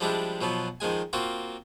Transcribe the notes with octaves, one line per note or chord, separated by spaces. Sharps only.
F3 G3 G#3 D4 E4
B2 F3 F#3 B3
D#3 F3 G#3 G#5
A#3 C4 F4 F#4